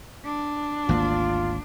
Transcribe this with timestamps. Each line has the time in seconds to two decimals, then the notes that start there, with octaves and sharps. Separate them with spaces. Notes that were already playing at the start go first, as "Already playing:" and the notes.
0.25 D4
0.89 G#1 D2 A#3 F4